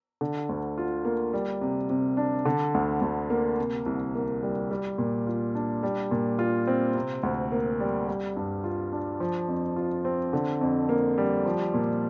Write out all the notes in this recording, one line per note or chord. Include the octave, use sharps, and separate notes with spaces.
D3
D2
F4
A#3
G3
C3
C3
D4
D3
D2
D2
A#3
C3
C2
A#3
G3
G3
A#2
F4
D4
G3
A#2
F4
C4
C3
D2
A#3
G3
G3
G2
F4
D4
F3
F2
F4
C4
D3
F2
A#3
G3
F3
A#2